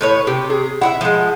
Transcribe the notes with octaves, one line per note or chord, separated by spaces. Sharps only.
A2 B4 C#5
C3 G4
G#4
E4 F4 E5 F#5
F3 G#3